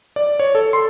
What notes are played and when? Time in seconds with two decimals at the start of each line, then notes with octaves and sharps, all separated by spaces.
0.16 D5
0.40 C#5
0.55 A4
0.73 C6